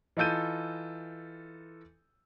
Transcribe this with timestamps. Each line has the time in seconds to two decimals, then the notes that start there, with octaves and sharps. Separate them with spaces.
0.17 E3 D#4 F4 A4 G6 D#7